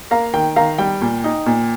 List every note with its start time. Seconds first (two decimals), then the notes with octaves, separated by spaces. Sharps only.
0.11 A#3 F5 A#5
0.34 D#3 G5
0.56 D#3 F5 A#5
0.78 G3 G5
1.01 A#2
1.24 D#4
1.46 A#2